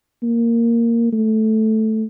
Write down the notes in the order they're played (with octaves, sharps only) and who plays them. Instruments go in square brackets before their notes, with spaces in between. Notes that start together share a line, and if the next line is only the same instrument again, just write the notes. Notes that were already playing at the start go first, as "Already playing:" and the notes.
[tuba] A#3
A3